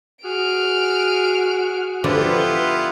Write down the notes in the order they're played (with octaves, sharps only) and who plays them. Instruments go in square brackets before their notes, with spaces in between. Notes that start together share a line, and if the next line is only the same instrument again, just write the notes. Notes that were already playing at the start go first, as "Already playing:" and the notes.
[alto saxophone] F#4 [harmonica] G#4 [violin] F6 D7
[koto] D3 F3 D4 [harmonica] B3 E4 F4 [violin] G4 B4